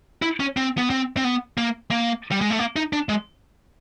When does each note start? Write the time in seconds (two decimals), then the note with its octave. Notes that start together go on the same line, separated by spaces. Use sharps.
0.22 E4
0.40 C#4
0.57 C4
0.78 B3
0.90 C4
1.17 C4
1.24 B3
1.57 A#3
1.91 A#3
2.31 G3
2.41 G#3
2.50 A3
2.59 A#3
2.76 D#4
2.93 D4
3.09 G#3